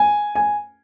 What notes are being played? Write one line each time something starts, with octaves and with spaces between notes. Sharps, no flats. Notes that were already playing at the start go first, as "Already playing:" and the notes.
Already playing: G#5
G#5